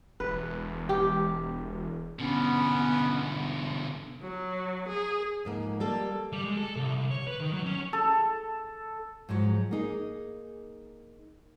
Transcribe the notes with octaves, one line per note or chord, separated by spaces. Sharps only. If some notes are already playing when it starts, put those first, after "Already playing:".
E1 B4
G4
B2 D3 B3 C#4
F#3
G#4
F2 G#2 A#3
G3 A#3 A4
G3
G#3
A4
C2
C2
C#5
B4
D#3
F#3
C#4
A4
G#2 F3 F#3
A#3 D#4 G#4